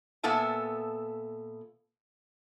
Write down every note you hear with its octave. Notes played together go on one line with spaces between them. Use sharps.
A#2 B3 A4 E5 A5